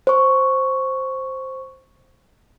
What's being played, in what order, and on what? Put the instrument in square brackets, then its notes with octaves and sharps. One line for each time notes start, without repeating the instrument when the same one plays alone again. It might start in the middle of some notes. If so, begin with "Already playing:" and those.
[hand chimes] C5 C#6